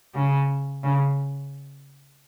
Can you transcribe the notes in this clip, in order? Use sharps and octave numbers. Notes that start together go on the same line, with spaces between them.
C#3
C#3